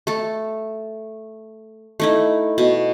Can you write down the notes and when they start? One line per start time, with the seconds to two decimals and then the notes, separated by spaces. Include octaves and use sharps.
0.07 A3 A4
2.00 A3 D#4 E4
2.58 B2